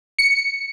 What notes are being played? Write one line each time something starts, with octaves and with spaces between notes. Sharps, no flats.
C#7